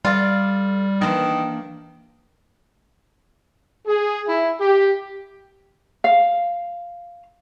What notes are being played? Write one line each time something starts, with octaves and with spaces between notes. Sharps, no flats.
G3 F4 A4 D5 F5
D#3 E3 A#3 D4
G#4
E4
G4
F5